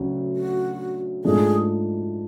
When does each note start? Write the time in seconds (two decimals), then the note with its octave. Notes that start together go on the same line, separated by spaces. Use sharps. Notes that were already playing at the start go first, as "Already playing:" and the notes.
Already playing: D2 C#3 F#3
0.36 F#4
1.24 G#2 F3 A3 D4 G#4